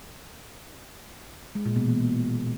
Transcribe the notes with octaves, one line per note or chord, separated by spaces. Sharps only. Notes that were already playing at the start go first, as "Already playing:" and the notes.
G#3
A#2
B2
E3